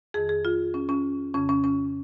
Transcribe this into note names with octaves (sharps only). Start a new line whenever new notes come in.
F2 D#3 G#4
G#4
F4
C#4
C#4
F2 C#3 C#4
C#4
C#4